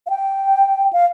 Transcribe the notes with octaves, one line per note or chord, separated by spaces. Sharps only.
F5
G5
F5